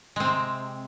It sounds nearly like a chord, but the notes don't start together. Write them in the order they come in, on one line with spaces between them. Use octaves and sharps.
G#3 C4 C3